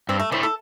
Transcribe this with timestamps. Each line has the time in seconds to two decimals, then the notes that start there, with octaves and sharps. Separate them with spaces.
0.09 G2 C4
0.20 A3
0.32 D3 A3 E4 C5
0.43 A4